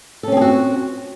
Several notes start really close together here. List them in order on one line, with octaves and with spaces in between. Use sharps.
A4 C#4 C4 G#4 F#4